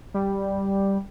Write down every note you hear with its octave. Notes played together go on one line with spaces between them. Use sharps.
G3